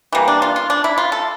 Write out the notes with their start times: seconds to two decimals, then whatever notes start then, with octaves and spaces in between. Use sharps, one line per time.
0.12 E3 G3 A#3
0.28 D4
0.42 F4
0.56 F4
0.70 D4
0.84 E4
0.98 F4
1.12 A4